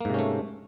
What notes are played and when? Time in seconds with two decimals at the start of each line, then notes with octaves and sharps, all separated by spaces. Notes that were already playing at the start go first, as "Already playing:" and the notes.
0.01 A#3
0.05 G#2
0.10 C3
0.14 C#4
0.19 A3